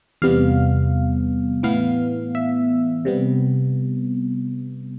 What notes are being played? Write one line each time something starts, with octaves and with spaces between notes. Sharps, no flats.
E2 C3 G3 B3 F5
A2 E3 B3 F5
E5
C3 G3 B3